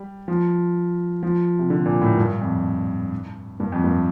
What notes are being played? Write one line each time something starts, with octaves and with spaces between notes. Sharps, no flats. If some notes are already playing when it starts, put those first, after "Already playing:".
Already playing: G3
F3
F3
C3
D3
A#2
A2
G2
F2
G2
F2
G2